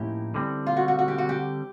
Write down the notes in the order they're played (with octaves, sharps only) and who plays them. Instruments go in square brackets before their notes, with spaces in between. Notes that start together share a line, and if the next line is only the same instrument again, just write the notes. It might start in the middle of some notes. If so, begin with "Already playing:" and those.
Already playing: [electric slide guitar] A2 F3 A#3 D#4 [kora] C#4 E4 G4
[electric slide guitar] D3 G3 C4
[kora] F4
F#4
F#4
F#4
G4
F#4
G4